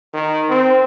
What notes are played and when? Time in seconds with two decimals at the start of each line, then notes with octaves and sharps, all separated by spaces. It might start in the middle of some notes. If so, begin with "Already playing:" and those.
0.13 D#3
0.50 C4